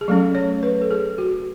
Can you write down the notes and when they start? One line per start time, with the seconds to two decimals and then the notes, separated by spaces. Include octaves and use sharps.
0.01 G#4
0.08 F#3 A3 C#4 A4
0.35 C#5
0.63 B4
0.82 A4
0.91 G#4
1.18 F#4